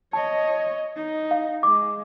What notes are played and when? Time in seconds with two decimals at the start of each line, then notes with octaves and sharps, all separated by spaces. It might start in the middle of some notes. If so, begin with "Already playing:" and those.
0.13 C#5 D#5 A5
0.96 D#4
1.31 F5
1.63 G#3 D6